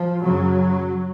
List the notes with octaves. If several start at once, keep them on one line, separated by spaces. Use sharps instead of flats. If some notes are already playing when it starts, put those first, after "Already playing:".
Already playing: F3
F#2 C#3 F#3